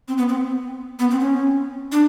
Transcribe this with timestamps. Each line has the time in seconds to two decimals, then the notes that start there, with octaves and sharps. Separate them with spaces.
0.08 C4
0.18 B3
0.29 C4
0.99 B3
1.11 C4
1.20 C#4
1.92 D4